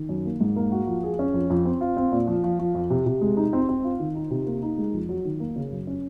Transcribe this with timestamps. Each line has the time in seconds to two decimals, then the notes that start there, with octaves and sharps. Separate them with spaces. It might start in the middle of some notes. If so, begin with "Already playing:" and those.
Already playing: D#3
0.09 F#2
0.25 A#3
0.41 G#2
0.56 A#3
0.71 F#4
0.87 F3
1.03 G#4
1.19 C#4
1.34 F2
1.50 F2
1.65 C4
1.81 F4
1.97 C4
2.12 A#2
2.28 F3
2.44 F3
2.59 F3
2.75 F2
2.90 C3
3.06 C3
3.21 G#3
3.37 D#4
3.53 C4
3.69 C4
3.84 F4
4.00 D#3
4.15 D#4
4.31 C3
4.47 A#3
4.62 D#4
4.78 G#3
4.93 F2
5.09 F#3
5.25 D#3
5.40 A#3
5.56 C#3
5.71 F#2
5.87 C#4